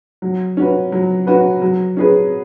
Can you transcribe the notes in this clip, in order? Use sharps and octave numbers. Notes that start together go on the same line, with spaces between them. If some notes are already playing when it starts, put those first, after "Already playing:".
F#3
C#4 F#4 B4
F#3
C#4 F#4 B4
F#3
C#4 G#4 B4